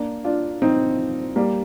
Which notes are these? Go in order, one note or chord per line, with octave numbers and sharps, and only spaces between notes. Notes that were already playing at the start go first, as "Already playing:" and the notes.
Already playing: A#3 D4
D4 F4
C4 D#4
G3 A#3